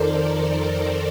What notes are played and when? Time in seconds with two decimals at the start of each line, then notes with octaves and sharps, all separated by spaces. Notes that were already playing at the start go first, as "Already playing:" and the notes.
Already playing: F2 D#3 A4 A#4 C5 D5
0.14 A#4 D5